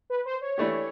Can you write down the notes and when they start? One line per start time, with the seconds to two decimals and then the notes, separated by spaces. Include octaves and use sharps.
0.10 B4
0.25 C5
0.41 C#5
0.58 E3 A3 D4 G4